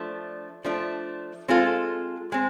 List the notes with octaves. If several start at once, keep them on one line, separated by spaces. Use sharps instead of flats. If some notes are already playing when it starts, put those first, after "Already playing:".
Already playing: F3 A3 D4
F3 A3 D4
G#3 C4 F4 A4
G#3 C4